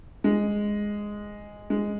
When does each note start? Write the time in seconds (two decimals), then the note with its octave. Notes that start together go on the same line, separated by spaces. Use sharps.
0.24 G#3
1.70 G#3